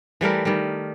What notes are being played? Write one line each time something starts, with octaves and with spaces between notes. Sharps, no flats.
E3 G3 A3 A#4
D#3 G3